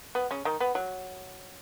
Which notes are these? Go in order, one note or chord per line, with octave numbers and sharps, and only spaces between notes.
B3
C#3 C#4
D#3 D#4
B3
F#3